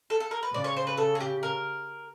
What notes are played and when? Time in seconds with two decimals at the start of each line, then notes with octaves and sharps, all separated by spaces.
0.10 A4
0.20 A4
0.31 A#4
0.43 B4
0.54 C#3 D5
0.64 C#5
0.77 C5
0.87 B4
0.97 A4
1.15 G#4
1.20 G4
1.43 A#4